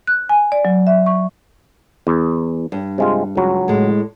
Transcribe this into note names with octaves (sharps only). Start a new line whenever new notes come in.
F#6
G#5
D5
F#3
E5
C#6
E2
G2
C3 G#3 F4
C#2 F#3
A2 G#3